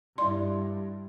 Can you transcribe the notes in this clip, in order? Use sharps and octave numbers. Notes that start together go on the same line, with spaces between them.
G2 E4 D5 C6